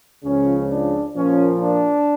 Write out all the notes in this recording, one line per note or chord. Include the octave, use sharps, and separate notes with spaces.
C#2 C#3 F3 C#4
D4
A#2 F3 A#3 C#4
D4